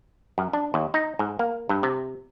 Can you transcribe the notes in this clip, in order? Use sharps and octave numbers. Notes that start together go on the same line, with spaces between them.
F#2
D4
D#2
D#4
G#2
A#3
G2
C3